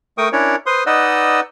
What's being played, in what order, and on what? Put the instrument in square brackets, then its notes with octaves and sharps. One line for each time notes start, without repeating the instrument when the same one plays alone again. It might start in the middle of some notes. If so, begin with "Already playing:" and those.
[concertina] A3 A#4 G5 C#6 D#6
C#4 D4 E4 A#4 C#5 D5
B4 C5 C6 D#6
D#4 B4 D5 D#5 F#5 E6